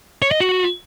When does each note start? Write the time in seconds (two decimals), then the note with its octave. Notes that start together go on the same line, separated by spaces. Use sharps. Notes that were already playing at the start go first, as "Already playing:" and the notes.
0.22 C#5
0.31 D#5
0.40 F#4